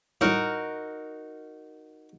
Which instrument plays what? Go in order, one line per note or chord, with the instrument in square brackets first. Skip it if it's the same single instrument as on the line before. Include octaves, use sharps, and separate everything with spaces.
[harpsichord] A2 G3 [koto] D#4 F#4 A#4